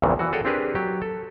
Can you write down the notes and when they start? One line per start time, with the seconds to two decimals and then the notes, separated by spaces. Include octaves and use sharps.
0.02 A#1 E2 G2 A#2 C#3 E3
0.19 E3 F#4
0.33 F#4 G#4 A4 C#5 G5 G#5
0.45 C4 D4 G4 G#4 A#4 B4
0.75 F#3 G4
1.02 A4